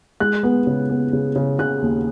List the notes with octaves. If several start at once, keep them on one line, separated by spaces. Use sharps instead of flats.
G#3 F#6
B3
C#3
B3
C#3
C#3
C#3 F#6
D#2